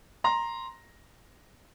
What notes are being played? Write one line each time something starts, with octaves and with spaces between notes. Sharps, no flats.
A#5 C6